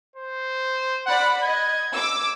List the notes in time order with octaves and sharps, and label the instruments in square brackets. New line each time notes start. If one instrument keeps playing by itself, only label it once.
[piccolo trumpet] C5
[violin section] D5 B5 [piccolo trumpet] F#5
[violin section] D#5 [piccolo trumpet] G#6
[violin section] D6 E6